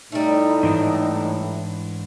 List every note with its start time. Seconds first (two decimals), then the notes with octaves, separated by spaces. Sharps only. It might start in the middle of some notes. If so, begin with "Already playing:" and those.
0.12 A2 G3 A3 D#4
0.63 G#2 E3 D4